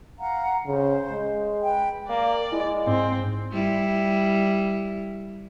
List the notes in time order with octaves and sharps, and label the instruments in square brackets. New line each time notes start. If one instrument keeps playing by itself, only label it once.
[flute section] F5 F#5 A#5
[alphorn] C#3 [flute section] C5
[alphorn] G#3
[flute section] B4 G5
[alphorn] A#3 [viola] D5
[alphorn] G#3 [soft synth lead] E4
[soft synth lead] G#2 [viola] C4
[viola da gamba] G3 E4